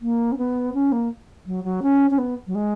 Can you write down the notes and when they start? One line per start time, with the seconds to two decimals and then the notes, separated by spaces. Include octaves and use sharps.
0.01 A#3
0.31 C#4
0.37 B3
0.74 C#4
0.92 A#3
1.46 F#3
1.63 F#3
1.82 C#4
2.10 C#4
2.18 B3
2.46 F#3
2.54 G#3